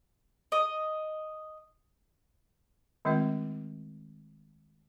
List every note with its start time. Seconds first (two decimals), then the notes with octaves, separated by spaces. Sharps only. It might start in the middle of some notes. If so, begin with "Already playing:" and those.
0.52 D#5
3.05 D#3 G#3 A3 C4 F4 E5